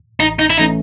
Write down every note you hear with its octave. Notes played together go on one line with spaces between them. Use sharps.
A1 D#4
D#4
E4
E3 A3 C#4 D#4